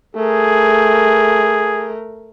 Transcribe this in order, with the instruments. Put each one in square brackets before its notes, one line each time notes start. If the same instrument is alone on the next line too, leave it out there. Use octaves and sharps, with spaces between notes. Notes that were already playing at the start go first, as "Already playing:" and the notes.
[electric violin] A3 A#4 [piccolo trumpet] G#4